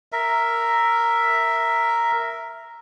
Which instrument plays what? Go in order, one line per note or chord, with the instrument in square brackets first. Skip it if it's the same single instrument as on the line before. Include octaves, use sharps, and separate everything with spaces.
[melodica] A#4 E5